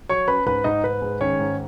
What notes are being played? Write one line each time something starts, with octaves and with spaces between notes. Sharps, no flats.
F#3 C#5 C#6
C#4 B4 B5
G#2 B4 B5
G#2 D#4 D#5
G#2 B4
G#3
D#3 C#4 C#5
G#2